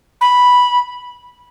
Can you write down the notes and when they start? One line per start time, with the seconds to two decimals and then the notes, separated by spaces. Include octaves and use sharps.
0.21 B5